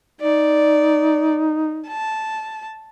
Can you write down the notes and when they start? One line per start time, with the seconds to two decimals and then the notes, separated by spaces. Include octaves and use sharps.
0.21 D#4 D5
1.87 A5